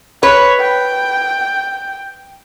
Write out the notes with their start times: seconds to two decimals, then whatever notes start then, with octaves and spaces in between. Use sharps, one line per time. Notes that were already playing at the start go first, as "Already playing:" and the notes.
0.23 B4 C#5
0.60 G5